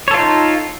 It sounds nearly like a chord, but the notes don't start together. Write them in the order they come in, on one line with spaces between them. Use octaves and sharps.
C#5 A4 F4 D#4